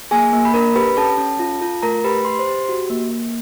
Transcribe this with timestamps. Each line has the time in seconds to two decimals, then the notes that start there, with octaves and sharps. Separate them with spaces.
0.11 A#3 G#4 G#5
0.33 A#3
0.45 B5
0.54 D4 A#4 A#5
0.75 G4 B4 B5
0.97 C#4 A4 A5
1.18 C#4
1.39 F4
1.61 F4
1.83 A3 A#4 A#5
2.04 G4 B4 B5
2.25 G4 C6
2.39 C5 C6
2.47 G4
2.69 F#4
2.90 A#3
3.11 A#3